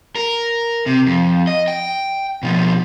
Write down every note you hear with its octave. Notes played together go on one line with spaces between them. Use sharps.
A#4
C3
F2
D#5
G5
B2 F3